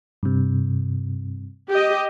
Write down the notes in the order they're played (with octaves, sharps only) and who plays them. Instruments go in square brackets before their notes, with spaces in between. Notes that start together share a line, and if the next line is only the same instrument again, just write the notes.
[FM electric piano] G2 C3
[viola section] G4 D#5